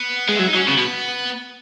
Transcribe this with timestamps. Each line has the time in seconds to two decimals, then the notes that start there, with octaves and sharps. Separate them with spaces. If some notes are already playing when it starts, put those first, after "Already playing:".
Already playing: B3
0.29 G#3
0.36 F#3 E4
0.47 D#4
0.54 F#3
0.58 C#4
0.68 C#3 B3
0.77 B2